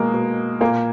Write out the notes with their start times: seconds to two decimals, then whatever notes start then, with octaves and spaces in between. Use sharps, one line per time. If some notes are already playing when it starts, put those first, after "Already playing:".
Already playing: B2 G#3 A#3
0.13 B2
0.60 A#2 A#3